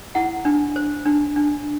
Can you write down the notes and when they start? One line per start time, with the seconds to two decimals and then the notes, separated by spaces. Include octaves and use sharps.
0.15 E4 F#5
0.45 D4
0.76 C5
1.06 D4
1.36 D4